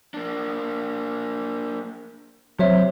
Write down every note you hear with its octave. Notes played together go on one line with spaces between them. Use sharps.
A#3 D4
C3 F#3 C5 C#5 E5